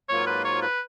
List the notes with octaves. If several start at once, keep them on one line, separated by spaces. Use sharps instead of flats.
G#2 F#3 A#3 F4 C#5
B4
C#5
B4